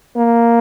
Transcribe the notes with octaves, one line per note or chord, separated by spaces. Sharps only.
A#3